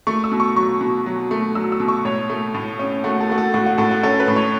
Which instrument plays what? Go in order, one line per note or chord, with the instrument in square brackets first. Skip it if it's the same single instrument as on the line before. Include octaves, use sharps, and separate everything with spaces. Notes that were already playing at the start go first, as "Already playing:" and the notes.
[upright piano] A3 C#6
E6
B2
C#6
F#3 C#6
B2
F#3
A3
F#3 E6
E6
B2
C#6
A2 C#5
A3
A2
C#4
A3 F#4
A4
A3 F#4
A4
A2 F#4
F#4
A2 A4
F#4
C#4 A4
B4
A2
C#5